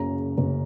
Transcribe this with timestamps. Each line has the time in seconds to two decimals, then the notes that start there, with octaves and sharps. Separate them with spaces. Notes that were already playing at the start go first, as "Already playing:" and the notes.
Already playing: F#1 F#2 C#3 A#5
0.37 F#1 F#2 C#3